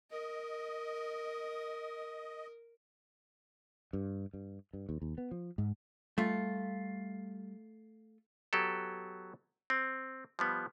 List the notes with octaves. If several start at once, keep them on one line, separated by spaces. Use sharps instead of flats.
A#4 D#5
G2
G2
G2
D#2
D#2
B3
F3
G#2
G3 A3 F4
F#3 B3 G4 A4
C4
F3 G3 B3